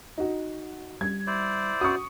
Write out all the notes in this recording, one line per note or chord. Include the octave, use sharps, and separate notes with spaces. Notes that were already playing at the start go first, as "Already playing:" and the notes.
D#4 F#4
G3 G#6
E4 C5 D5
F#4 C#6 D#6